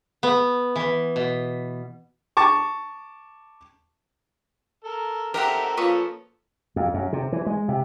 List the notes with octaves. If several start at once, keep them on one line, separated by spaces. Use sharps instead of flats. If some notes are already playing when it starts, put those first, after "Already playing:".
B3
E3
B2
A5 C#6 D6
A4 A#4
C4 D#4 G4 A4 A#4 E5 F#5
F3 A#3 C#4 F4 A4 B4 C#6 D#6
F2
F#2
C3
E3
G#3
C3